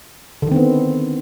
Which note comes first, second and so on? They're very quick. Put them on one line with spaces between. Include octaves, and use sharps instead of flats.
D3 D#3 C4 B3